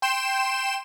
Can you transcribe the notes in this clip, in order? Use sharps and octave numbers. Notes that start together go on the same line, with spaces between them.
G5 C6 E7